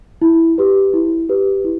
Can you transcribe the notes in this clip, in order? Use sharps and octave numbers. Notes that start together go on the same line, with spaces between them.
E4
G4 B4
E4
G4 B4
E4